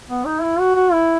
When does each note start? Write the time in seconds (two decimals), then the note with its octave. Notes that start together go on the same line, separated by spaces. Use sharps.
0.08 B3
0.25 D#4
0.42 E4
0.59 F#4
0.75 F#4
0.92 E4